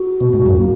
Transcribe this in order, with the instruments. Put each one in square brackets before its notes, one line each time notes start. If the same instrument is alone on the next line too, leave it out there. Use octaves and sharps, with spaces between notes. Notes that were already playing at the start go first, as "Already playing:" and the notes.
Already playing: [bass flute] F#4
[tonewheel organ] B2
G#2
F#2
[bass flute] A#3